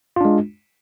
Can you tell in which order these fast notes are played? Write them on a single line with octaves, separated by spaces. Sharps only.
F4 D4 G#3